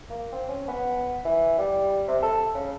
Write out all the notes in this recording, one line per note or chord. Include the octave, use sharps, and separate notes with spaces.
A#3
C4
C#4
B3
E3
G3
C3
A4
C#3